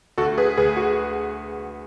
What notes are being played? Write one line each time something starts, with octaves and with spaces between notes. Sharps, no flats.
D2 F#4 A4
G#4 B4
D2 G#4 B4
F#4